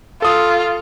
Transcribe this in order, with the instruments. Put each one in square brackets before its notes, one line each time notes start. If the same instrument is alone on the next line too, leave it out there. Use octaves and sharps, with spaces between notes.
[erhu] F4 [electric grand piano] A4 D#6